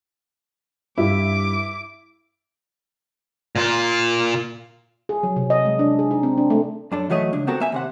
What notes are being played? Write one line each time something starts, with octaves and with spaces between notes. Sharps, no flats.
G2 E4 D6
A#2 F4
G#4
F#3
C3
D#5
G#3
D4
G#4
D#4
C4
D4
A3
F#2 D4 A4
E3 F#3 A3 D#5 E5
C#2 D4
B3 C4 F#4 A4 A#4
A#3 E5 G#5
D#2 C3 F#5